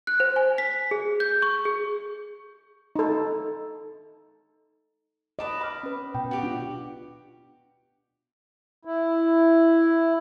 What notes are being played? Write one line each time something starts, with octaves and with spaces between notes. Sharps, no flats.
F#6
C5
G#5
B6
G#4
G6
C#6
G#4
D#4 A4
B4 D#5 A5 D6
B5 D6 F6
C#4 B4
B2 G5
F#4 G4 D6
D4 F4
E4